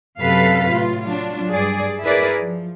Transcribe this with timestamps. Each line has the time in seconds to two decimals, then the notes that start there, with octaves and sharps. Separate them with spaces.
0.19 F#2 C3 F#3 A4 B4 F5
0.69 A2 F4
1.03 F#3 D4 F4
1.52 G2 G#4 D5
2.04 E4 G#4 A#4 B4 D5
2.40 F3